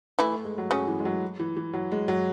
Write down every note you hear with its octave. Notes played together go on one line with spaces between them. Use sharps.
E3 A3 E4
A3
G#3
F#3
C#3 F#3 C#4
E3
G#3
F#3
E3
E3
F#3
G#3
F#3